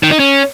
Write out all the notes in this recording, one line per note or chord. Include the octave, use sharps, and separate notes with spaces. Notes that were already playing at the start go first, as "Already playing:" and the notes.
D#3
D#4
C#4